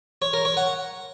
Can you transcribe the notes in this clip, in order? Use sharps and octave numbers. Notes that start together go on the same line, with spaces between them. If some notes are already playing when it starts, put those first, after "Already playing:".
C#5
A#4
C#5
F#5